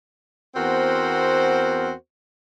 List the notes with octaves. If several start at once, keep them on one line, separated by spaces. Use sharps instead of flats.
E2 B3 C4 F#4 A#4 C5